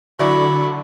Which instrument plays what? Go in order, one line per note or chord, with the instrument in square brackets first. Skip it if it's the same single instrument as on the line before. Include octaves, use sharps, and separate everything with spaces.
[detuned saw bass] D3 [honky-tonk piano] F#3 E4 D5 [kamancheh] B5 C#6